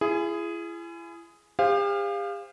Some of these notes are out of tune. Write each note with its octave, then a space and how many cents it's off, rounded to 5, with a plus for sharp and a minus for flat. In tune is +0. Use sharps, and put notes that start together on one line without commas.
E4 +40 G#4 +0
G4 +45 C5 +0 F5 +0